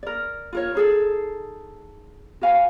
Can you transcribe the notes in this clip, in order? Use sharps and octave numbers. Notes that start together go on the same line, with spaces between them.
A#4 D5
F4 A#4 C#5
D#4 G#4 A4
F#4 B4 F5 G#5